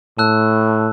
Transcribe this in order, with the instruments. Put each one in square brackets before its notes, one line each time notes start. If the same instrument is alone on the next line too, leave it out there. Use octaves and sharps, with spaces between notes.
[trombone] A2 [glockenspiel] A5 E6 F#6